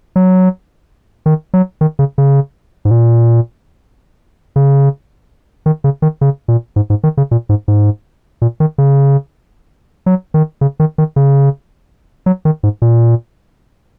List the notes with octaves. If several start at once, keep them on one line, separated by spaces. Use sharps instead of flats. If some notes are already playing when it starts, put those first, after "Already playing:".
F#3
D#3
F#3
D#3
C#3
C#3
G#2
A#2
C#3
D#3
C#3
D#3
C#3
A#2
G#2
G#2
D#3
C#3
A#2
G#2
G#2
A#2
D#3
C#3
F#3
D#3
C#3
D#3
D#3
C#3
F#3
D#3
G#2
A#2